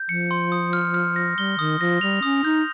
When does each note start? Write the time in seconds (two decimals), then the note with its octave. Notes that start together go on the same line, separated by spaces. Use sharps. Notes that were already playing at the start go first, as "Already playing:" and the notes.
Already playing: G6
0.09 F3 C#7
0.31 C6
0.52 D#6
0.73 F6
0.94 F6
1.16 A#6
1.37 G3 G7
1.59 D#3 D#6
1.80 F3 A#6
2.01 G3 F7
2.22 C#4 D#6
2.44 D#4 G6